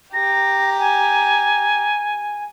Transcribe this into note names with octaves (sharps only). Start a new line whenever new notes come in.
G4 A#5 A#6
G#5